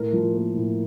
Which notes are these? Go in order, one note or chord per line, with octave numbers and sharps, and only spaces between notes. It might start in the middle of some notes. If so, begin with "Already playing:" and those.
Already playing: A2 A#4
F3
A#3
A2